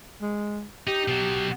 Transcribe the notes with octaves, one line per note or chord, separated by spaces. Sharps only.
G#3
D#4 G4
B2 F#3